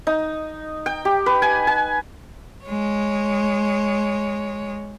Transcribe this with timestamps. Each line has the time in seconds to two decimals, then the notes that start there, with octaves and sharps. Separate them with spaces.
0.07 D#4
0.86 G5
1.05 G4
1.26 B4
1.42 G#5
1.67 G#5
2.65 G#3 C#5